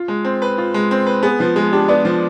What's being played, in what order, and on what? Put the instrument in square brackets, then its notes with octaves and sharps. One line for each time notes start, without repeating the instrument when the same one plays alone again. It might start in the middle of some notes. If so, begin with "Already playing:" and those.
Already playing: [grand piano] F4
G#3
C4
B4
F4
G#3
C4
B4
[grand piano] B3 [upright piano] G#4
[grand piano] F3 [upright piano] B4
[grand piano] G#3 [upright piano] G#4
[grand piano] D4 [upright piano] G4
[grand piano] B3 [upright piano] D5
[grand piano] F3